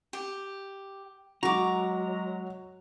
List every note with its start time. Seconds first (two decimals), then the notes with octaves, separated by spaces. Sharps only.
0.13 G4
1.43 F#3 G#3 F#4 A#5 C#6 D6